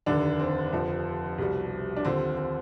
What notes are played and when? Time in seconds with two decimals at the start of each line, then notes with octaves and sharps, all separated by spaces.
0.06 F1 D#2 D3 D#3 D4
0.40 C4
0.73 F1 F2 D3 F3
1.38 C2 B2 G3
1.96 D4
2.05 D#2 D3 F3 C4
2.37 C4